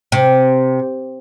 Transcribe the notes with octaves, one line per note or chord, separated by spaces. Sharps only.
C3